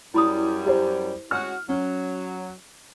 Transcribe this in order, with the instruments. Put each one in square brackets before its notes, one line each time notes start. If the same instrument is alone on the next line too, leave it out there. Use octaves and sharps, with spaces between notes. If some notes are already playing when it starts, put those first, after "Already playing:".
[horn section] F#2 G3 [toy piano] E4 B5 D#6
[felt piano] G4 C5
[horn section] G#3 C#4 F#4 [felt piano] F6
[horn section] F#3 [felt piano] C#4